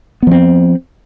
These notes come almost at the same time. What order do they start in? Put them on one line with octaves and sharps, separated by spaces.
B3 F3 C4